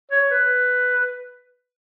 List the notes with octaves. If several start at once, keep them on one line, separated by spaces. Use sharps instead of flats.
C#5
B4